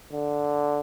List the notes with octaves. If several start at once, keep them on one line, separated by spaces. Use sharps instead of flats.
D3